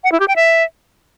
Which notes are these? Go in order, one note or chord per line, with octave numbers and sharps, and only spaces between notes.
F#5
E4
G4
G5
E5